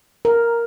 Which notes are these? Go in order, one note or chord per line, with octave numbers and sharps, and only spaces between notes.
A#4